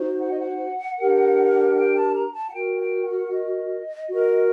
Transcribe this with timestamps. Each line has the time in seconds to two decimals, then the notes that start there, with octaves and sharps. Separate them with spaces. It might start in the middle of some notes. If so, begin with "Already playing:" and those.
Already playing: D#4 F#4 C5
0.21 F#5
0.30 D#5
0.39 F#5
0.99 D4 G4 A#4
1.76 G5
1.96 A5
2.15 A#5
2.34 A5
2.49 F#5
2.53 F#4 A#4 G5
2.79 G5
3.05 F#5
3.32 D#5
4.08 F#4
4.13 A#4